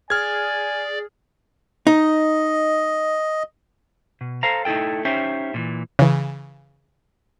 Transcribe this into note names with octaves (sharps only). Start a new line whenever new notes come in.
G#4 D5 G#5 F6 G#6
D#4 D#5
B2
A4 C5 F5 A#5
A3 D#4 E4 A4 G5
C#4 D#4 G4 C5 E5 G5
A#2 D#3 E3
C#3 E3